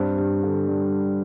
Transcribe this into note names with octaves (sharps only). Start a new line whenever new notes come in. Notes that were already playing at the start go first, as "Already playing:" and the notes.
Already playing: G2 C4
G2
D3
G3